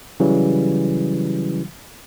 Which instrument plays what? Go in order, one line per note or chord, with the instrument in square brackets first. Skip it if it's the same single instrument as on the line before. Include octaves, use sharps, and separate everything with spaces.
[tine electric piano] C#3 E3 F#3 G3